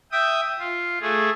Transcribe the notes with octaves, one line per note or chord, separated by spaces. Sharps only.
E5 G5 D#6
F4
A3 G#4